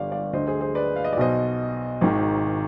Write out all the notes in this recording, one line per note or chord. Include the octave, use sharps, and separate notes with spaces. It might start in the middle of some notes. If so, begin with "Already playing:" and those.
Already playing: G1 G2 D3 D5 F5
D5 F5
D2 D3 C5 D#5
G#4 C5
G#4 C5
B4 D5
F5
D#5
D5
B1 B2 C5 D#5
G#1 G#2 D#3